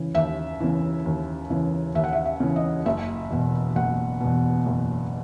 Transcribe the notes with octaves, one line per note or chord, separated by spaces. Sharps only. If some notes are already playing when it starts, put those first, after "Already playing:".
Already playing: C#3 E3
D#2 E5
C#3 E3
D#2
C#3 E3
D#2 E5
F#5
E5
E5
C#3 E3
D#5
F#1 E5
E2 B2
F#1 F#5
E2 B2
F#1